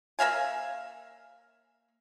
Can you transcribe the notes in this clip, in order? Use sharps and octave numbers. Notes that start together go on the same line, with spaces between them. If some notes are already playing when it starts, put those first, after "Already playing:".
A#3 E5 F5 G#5